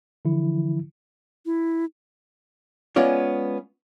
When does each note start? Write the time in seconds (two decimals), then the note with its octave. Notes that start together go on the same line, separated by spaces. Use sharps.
0.25 D3 E3 F3 E4
1.46 E4
2.96 G#3 B3 C#4 F4 D5